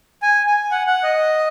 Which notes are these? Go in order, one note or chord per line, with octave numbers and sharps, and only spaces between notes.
G#5
G#5
F#5
F#5
D#5